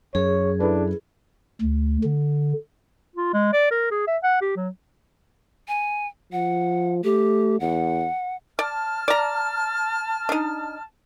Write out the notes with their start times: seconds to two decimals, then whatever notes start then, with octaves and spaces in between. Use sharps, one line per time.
0.15 F#2 G#4 C#5
0.60 D4 E4 A4 B4
1.61 D2
2.04 D3
3.16 F4
3.33 G#3
3.53 D5
3.71 A#4
3.91 G#4
4.07 E5
4.23 F#5
4.41 G4
4.56 F#3
5.68 G#5
6.32 F3 F#5
7.04 A3 G4
7.60 E2 F#5
8.59 D5 A5 F6
9.08 D5 A#5
10.29 D4 D#4